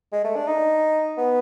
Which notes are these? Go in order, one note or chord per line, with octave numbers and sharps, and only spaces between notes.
G#3
A3
D4
D#4
B3